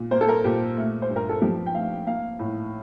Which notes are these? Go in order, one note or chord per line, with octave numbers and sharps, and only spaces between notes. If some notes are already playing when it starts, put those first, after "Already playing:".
Already playing: A#2
A#3 C5
A4
A#4
A#2 G4
A3
C5
G2
A#4
A4
F3 G4
G5
A3 F5
A#3 F5
A2